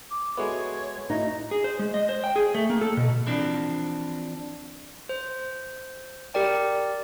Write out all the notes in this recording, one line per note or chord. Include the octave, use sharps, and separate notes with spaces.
D6
G#3 B3 F#4 A4 C#5 E5
A2 D#4 F#4 E5
G#4
C5
G#3
D#5
C5
G5
G#4
A3
A#3
A4
B2
E3 F3 C4 D4
C5
G4 A#4 D5 G5